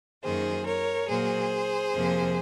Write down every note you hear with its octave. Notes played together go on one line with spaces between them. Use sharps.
F#2 D#3 F#3 A#3 G#4 C5
A#4 C#5
A#2 F#3 A#3 G#4 C5
F2 C3 F3 A#3